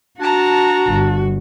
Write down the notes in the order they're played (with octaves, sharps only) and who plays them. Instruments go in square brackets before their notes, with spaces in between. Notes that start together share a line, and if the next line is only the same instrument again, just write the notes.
[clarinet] D4 [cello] F#4 [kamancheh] A5 A#5
[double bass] G1